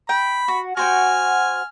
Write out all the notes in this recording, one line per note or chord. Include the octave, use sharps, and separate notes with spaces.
G5 B5
F#4
F#4 C5 G5 G#5 F6